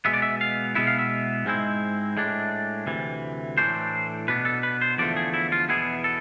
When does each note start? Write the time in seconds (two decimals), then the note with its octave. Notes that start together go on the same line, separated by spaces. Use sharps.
0.05 B2 G#3 B3 E5
0.14 D5
0.22 E5
0.41 F5
0.75 B2 G#3 B3 E4 E5
0.87 F5
0.99 E5
1.45 G#2 G#3 C4 E4
2.17 A2 G#3 D4
2.87 D2 C3 E3
3.58 A2 E3 A3 D4 C5
4.28 B2 B3 D4 B4
4.45 A4
4.63 B4
4.81 C5
4.98 E2 D3 F3 A3 D5
5.16 G#4
5.34 E4
5.52 F4
5.69 E2 B2 B3 E4 G#4
6.04 A4